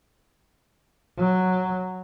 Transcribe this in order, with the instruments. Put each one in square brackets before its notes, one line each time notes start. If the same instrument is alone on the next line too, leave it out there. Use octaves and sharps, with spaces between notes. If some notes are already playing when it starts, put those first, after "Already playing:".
[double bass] F#3